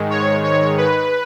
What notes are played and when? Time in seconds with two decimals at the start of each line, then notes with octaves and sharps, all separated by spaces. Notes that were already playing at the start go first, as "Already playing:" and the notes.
Already playing: G#2 D#3 G#3
0.10 C#5
0.44 C#5
0.78 B4